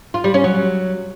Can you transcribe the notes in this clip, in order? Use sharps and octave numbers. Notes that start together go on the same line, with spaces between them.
F4
G3
C#4
F#3